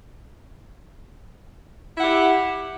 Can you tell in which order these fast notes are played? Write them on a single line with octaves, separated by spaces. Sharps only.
E4 F#5 G4